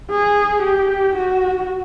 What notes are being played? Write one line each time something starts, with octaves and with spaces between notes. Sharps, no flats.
G#4
G4
F#4